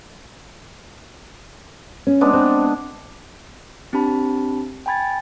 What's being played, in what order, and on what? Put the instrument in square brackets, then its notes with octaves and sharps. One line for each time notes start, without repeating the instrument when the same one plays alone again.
[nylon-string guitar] C#4
[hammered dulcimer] G#3 B3 D4
[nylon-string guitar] C4
[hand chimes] C4 D4 G4 A5 B5
G5 G#5 B5 G#6 A6